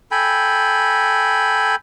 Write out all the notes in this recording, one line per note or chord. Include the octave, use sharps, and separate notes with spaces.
A4 G5 G#5 B5